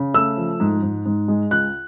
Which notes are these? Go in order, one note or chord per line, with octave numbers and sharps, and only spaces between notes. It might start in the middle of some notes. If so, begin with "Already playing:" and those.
Already playing: C#3
A3 E6
F3
G#2
G#2
G#2
G#3
C#2 F#6